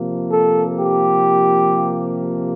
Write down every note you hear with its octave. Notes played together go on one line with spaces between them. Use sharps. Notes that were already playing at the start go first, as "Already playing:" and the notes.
Already playing: C3 F3 A#3
A4
G4